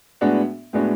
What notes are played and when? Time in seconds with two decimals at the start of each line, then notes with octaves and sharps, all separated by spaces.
0.21 A2 G#3 B3 D4 F#4
0.73 A2 G#3 B3 D4 F#4